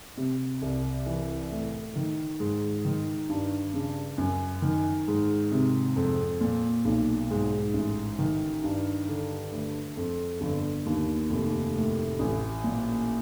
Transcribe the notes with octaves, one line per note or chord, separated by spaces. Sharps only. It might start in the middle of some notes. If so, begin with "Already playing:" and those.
C3
C2
E3
A2
D#3
G#2
D#3
G2
C#3
F#2
D#3
G#2
C3
F2
A#2
B1
G#2
A1
D#3
G2
D3
D2
F2
G1
D#2
F1
A2
A1
A#2